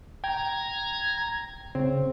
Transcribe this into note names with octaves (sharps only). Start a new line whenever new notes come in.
G5 A#5 G#6
C#3 C4